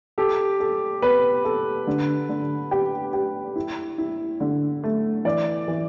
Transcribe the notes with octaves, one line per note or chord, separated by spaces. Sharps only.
G4 A4
A4
B3 B4
A4
D3
D3
G4
G4
E4
E4
D3
A3
E3 D5
E3